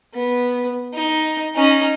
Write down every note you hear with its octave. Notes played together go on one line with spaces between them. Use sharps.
B3
D#4
C#4 D#4